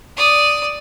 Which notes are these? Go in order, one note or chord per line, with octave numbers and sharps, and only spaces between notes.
D5 D#6